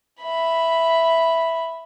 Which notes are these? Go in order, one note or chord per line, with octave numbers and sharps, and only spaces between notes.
E5 B5